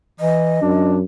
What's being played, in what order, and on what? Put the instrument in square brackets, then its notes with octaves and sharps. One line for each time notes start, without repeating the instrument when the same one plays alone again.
[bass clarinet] E3 [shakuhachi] D#5
[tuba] F#2 [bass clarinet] D4